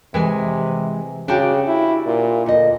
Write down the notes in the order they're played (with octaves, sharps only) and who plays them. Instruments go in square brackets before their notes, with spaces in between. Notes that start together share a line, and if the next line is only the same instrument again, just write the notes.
[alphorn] C3 [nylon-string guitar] E3 G#3 G#5
[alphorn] C#3 [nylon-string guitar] D4 F#4 G4
[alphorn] E4
A#2
[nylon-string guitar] D2 D#5 [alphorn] A#2